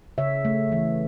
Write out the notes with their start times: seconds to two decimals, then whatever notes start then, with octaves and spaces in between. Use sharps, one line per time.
0.18 C#3 C#5 E5
0.45 A3
0.72 E3